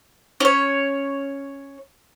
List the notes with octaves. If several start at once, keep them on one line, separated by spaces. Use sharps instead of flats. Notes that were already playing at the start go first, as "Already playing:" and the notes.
C#4 C#5